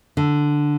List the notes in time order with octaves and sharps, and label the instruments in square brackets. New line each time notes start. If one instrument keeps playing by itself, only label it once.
[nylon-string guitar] D3